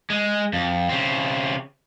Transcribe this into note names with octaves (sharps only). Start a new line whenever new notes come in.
G#3
F2
C#3 C4